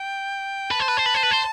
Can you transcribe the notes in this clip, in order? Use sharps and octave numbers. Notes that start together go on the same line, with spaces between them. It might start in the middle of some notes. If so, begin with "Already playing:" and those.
Already playing: G5
B4 A5
C5
B4
C5
B4
C5
B4
C5